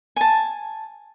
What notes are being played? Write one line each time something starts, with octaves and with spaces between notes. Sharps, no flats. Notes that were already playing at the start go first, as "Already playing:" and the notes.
G#5 A5